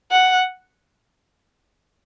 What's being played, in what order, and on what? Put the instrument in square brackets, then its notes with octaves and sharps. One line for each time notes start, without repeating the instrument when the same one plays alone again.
[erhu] F#5